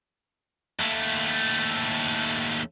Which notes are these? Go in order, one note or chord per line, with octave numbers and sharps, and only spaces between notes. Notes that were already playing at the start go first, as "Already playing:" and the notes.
D#2 A3